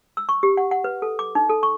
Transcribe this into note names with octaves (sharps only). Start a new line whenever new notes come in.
E6
C#6
G4
F#5
F#5
B4
A4
D6
D#4
A4
C#6